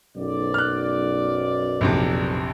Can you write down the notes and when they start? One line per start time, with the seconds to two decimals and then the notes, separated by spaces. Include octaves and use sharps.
0.16 B1 F#2 D5
0.54 F6 F#6
1.81 A#1 F2 C3